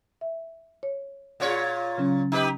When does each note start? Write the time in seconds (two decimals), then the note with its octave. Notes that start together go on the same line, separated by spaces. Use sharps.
0.21 E5
0.83 C#5
1.40 A#2 F4 G#4 C#5 D5
1.98 C#3 F#3 C#4
2.32 D#4 G4 B4